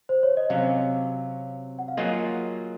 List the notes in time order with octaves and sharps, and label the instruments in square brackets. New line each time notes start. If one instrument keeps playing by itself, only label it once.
[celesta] C5
C#5
D#5
[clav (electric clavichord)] C3 F#3 C#4 [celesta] F5
[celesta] F#5
F5
[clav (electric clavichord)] F#3 A#3 F4 G#4 [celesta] D#5